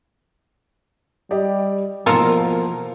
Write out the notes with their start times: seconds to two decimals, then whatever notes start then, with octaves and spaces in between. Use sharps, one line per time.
1.31 G3 G4 D5 D#5
2.06 B2 E3 F3 A#3 F4 A4 A#4